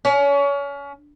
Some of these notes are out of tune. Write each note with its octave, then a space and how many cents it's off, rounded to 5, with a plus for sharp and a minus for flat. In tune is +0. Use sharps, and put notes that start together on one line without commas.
C#4 +30